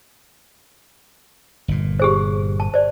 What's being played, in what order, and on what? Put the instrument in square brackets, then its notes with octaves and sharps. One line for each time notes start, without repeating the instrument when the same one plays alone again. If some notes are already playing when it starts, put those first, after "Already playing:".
[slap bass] G1 A#2
[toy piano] G4 G#4 C5
A5
C5 D5